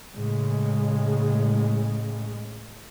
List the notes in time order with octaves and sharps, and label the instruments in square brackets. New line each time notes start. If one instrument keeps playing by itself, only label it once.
[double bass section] A2 C#3 G#3